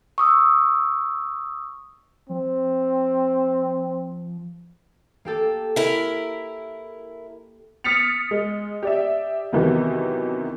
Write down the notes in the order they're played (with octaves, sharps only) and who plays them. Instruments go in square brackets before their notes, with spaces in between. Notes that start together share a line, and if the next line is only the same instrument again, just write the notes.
[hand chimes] C#6 D#6 E6
[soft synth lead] F3 [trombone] C4
[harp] A#3 G4 A4
[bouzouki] E4 A#4
[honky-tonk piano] D#6 F6 A6 B6 C#7 F7
G#3
G4 D5 E5
E2 C3 D#3 E3 F#3